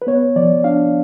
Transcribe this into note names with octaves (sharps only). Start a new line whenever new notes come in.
B4
B3 C#5
F3 D5
D4 F5